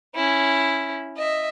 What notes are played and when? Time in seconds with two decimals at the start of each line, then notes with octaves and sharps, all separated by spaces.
0.15 C#4 E4
1.17 D#5 E5